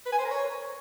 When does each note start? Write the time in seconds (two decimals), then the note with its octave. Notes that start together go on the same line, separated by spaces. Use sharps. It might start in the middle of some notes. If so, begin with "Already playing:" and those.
0.06 B4
0.12 G#5
0.19 C5
0.25 A#4
0.31 C#5